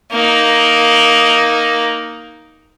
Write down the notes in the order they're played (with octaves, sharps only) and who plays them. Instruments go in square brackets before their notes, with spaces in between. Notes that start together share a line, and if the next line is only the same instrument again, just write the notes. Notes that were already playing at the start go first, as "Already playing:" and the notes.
[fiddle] A#3 D#4